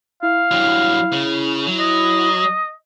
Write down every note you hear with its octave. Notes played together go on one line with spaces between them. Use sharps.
E4 F5
G2 F#3
C#3
F#3
D#5